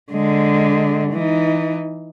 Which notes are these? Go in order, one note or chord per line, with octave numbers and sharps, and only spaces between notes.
D3 G#3
E3 D#4